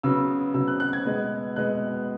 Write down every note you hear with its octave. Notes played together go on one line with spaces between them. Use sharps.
C#3 F#3 B3 E6
C#3 F#3 B3 E6
F#6
F#6
G#6
B2 G#3 B3
B2 G#3 B3 F#6